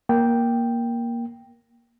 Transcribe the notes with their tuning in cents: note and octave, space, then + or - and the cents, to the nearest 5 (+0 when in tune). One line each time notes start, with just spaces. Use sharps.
A#3 +10 G5 +0